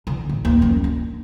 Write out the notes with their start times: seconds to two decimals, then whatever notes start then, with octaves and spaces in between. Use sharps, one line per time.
0.07 D3
0.29 A1
0.45 D#2
0.62 F#2
0.84 D4